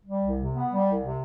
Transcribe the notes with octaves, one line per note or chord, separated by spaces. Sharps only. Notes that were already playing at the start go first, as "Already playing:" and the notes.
G3
C2
C3
B3
G3
C2
C3